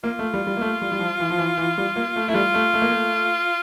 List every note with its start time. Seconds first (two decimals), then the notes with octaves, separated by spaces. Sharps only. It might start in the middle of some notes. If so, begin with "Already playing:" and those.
0.04 A#3 F4
0.19 A3
0.34 G3
0.47 G3
0.57 A#3
0.61 A3
0.82 G3
0.92 G3
1.00 F3
1.20 E3
1.30 F3
1.38 E3
1.58 E3
1.78 G3
1.96 A#3
2.16 A3
2.28 A3 E4
2.34 G3 F4
2.54 A3
2.74 A3
2.82 A#3
2.90 A3